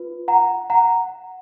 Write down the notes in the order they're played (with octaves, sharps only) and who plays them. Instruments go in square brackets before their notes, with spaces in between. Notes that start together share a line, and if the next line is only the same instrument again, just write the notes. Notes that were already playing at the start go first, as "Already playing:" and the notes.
Already playing: [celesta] F4 B4
F#5 A#5
F#5 A#5